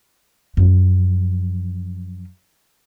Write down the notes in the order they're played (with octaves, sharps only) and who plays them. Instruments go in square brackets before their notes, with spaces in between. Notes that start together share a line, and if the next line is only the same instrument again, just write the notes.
[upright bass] F#2 F3